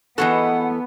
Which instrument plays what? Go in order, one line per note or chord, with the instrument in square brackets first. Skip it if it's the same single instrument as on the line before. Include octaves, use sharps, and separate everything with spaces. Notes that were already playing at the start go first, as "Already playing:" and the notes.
[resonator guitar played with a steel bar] E3 A4 [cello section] B3 [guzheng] F#4 G#4 D#5 [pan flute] F#5